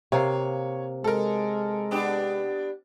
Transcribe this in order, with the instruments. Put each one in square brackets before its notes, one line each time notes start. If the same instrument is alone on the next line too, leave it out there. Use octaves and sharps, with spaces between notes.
[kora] C3 A#3 F5 [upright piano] C#5
[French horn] G#3 [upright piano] A4 A#4
[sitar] B3 D4 G4